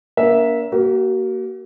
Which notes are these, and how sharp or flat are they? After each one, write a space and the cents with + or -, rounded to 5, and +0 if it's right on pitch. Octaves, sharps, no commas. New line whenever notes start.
A#3 +20 D4 -40 E5 -10
A#3 +0 F#4 +40